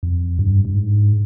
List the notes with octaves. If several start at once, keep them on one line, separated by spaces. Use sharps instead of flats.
F2
G2
G2
G#2